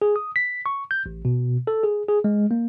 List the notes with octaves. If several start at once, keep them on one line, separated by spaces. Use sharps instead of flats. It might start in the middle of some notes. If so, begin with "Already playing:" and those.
G#4
D#6
B6
C#6
G6
A1
B2
A4
G#4
G#4
G#3
A#3